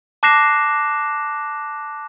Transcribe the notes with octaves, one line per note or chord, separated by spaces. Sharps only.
A5 D6 F#6 A#6 C7 E7